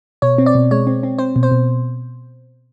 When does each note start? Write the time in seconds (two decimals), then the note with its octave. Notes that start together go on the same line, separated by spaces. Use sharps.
0.22 B2 C#5
0.38 C4
0.46 D5
0.55 B2
0.71 G#3 C#5
0.87 C4
1.03 C4
1.18 C4 C5
1.36 B2
1.43 C5
1.52 B2